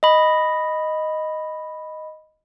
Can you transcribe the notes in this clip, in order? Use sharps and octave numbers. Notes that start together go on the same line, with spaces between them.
D#5 B5